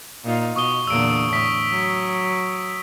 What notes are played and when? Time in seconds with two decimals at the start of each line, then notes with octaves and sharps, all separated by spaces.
0.24 A#2 D#4 F4
0.56 B2 C#6 D#6 G7
0.87 E2 A#2 D3 E6 D7
1.33 A2 C#6 D#6 B6
1.71 F#3